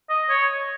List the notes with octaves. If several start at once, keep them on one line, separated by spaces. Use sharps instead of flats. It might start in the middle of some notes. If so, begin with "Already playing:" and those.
D#5
C#5